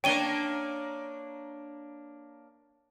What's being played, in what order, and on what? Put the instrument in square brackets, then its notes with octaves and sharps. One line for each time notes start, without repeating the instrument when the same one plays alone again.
[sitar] A#3 D4 C#5 [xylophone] G5 D#7 G7